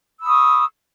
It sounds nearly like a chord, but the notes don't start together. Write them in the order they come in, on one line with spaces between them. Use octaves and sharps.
E6 B5 D#6 C#6